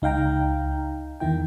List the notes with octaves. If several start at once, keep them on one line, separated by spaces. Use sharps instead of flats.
C#2 D#4 F5 G5 A#5
E2 D#3 E4 G5